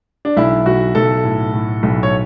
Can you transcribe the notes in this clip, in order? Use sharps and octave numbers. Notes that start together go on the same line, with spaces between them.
D4
B1 E4
B1 F#4
B1 A4
A2
A2
B1
C#5